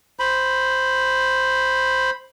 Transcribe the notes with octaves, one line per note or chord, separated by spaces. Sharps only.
C5 B5